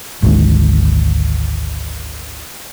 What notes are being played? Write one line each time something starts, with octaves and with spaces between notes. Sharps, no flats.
G#1 D2 D#3 G#3